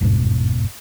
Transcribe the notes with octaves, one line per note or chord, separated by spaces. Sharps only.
G1 E2 G#2 B2